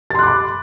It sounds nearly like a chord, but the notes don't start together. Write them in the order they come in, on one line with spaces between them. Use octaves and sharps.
A6 C6 F#6 D6 B5